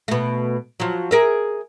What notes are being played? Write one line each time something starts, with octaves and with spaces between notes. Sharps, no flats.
B2 A3
F3 F#3
G#4 A#4 E5